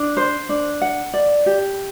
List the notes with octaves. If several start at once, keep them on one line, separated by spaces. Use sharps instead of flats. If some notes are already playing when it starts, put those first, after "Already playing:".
Already playing: D4
C5
D4
F#5
D5
G4